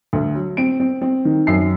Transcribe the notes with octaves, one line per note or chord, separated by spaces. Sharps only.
D2
F#3
C4 D7
C4
C4
D#3
F#2 C7